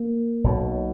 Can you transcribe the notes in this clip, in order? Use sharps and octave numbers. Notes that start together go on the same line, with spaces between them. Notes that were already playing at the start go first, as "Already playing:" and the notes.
Already playing: A#3
B1 B2